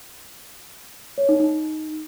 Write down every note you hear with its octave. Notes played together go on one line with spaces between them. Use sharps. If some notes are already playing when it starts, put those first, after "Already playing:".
C#5
D#4
D#4